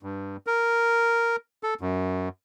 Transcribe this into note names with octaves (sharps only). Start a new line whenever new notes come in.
G2
A#4
A4
F#2